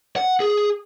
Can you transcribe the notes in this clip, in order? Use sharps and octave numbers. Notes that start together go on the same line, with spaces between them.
F#5
G#4